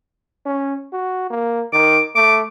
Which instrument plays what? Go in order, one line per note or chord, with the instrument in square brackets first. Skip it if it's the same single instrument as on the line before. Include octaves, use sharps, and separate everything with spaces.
[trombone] C#4
F#4
A#3
[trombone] D#3 [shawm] D6
[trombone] A3 [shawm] D6